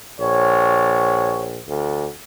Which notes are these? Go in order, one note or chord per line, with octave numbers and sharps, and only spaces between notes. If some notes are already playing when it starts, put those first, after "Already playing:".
A#1 C#5
D2